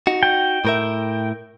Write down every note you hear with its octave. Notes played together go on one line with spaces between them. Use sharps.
D#4 F#4
G5
A2 A#4 E5